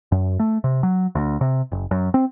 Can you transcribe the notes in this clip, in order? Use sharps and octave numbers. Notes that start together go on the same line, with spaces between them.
F#2
A3
C3
F#3
D2
C3
F#1
F#2
C4